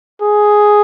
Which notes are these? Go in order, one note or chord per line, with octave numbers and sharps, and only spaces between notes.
G#4